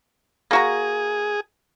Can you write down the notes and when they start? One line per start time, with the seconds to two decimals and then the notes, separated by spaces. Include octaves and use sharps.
0.51 A#3 F#4 G#4 A#5